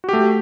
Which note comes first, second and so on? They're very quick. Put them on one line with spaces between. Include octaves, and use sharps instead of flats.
F#4 G4 A3